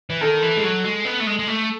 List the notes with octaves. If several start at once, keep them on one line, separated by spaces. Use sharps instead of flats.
E3
D#3 A4
E3
G#3
F#3
G#3
B3
A3
G#3
G#3
A3